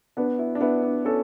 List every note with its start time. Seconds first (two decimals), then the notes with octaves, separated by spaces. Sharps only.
0.17 B3 D4
0.39 E4
0.55 D4
0.61 B3 E4
0.83 D4
1.05 C#4 A4